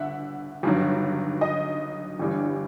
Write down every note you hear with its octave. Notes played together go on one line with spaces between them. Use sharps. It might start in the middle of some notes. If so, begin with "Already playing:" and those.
Already playing: G1 G2 E5 F#5
G1 G2 D#3 F#3
D#5
G1 G2 E3 G3